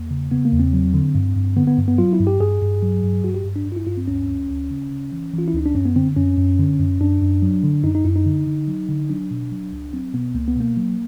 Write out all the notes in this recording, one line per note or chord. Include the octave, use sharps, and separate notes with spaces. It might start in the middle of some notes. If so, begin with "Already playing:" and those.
Already playing: E2 A#3
C#3
C#3 B3
A#3
E2
C4
F#3
D3
G2
G2
D3 B3
B3
G2
B3
F#3 F4
E4
G2
G4
G2 G#4
G2
F#3
G2
G2 F#4
G4
G2
D4
G2
F4
E4
G2 F4
C4
D2 C#4
D2
D2
C#3
C#3
E3
E3
F4
E4
D2 D#4
D4
F#2 C#4
B3
D3 C4
F#2 C#4
F#2
D3
F#2
F#2 D4
F#2
F#3
D3
F#2 D#4
D#4
F#2 E4
D#4
D3
D3
F#3
D3
F#3 D4
B2
F#3
C#2
F#3 C4
B2 B3
C#2 A#3
B3
B2 A#3
F#3